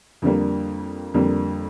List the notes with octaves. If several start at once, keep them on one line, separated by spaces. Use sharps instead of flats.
F2 D3 G3 A#3
F2 D3 G3 A#3